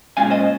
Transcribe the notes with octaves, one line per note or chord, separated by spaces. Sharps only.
A#2 G#3 C#4 F4 F5 G#5
C5 D#5